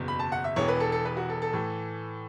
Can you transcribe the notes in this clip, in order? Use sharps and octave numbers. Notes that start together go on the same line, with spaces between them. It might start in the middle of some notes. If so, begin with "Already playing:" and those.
Already playing: F#1 E2 B2
B5
A5
F#5
E5
E1 E2 E3 C#5
B4
A4
A4
B4
F#4
A4
A4
A2 E3